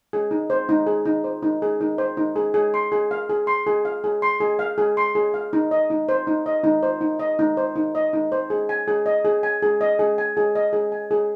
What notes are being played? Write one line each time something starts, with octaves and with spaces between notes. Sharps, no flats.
G#4
D#4
C5
D#4
G#4
D#4
C5
D#4
G#4
D#4
C5
D#4
G#4
G#4
C6
G#4
F5
G#4
C6
G#4
F5
G#4
C6
G#4
F5
G#4
C6
G#4
F5
D#4
D#5
D#4
C5
D#4
D#5
D#4
C5
D#4
D#5
D#4
C5
D#4
D#5
D#4
C5
G#4
G#5
G#4
D#5
G#4
G#5
G#4
D#5
G#4
G#5
G#4
D#5
G#4
G#5
G#4